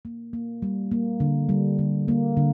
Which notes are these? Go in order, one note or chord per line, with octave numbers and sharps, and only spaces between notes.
A#3
A#3
G3
A#3
D3
G3
D3
A#3
D3